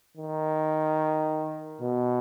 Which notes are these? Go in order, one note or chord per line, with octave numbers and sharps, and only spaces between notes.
D#3
B2